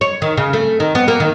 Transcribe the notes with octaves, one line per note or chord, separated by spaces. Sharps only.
C#5
D#3
C#3
A3
D#3
B3
A#3
D#3